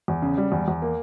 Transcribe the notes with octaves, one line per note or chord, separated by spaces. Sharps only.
E2
C#3
G3
E2
E2
A#3